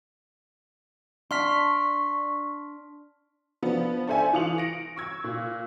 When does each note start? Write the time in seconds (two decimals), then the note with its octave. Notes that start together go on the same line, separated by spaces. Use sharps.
1.31 D4 C6 C#6 F6 B6
3.62 F3 B3 D4
4.07 D4 A4 C5 E5 G#5
4.33 E3 F4 D#6 C#7 F7 F#7
4.58 A#6 C#7 D7
4.96 C#6 E6 G#6
5.24 A#2